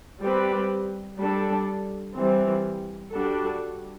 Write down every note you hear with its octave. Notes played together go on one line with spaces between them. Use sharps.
G3 C4 G4 B4
G3 D4 A4
E3 G3 C4
G3 D4 F#4 A4